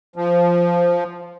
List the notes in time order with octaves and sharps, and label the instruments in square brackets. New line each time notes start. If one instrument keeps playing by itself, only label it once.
[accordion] F3